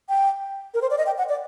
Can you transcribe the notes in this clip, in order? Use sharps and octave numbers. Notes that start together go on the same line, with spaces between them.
G5
A#4
C5
D5
D#5
G5
F#5
D5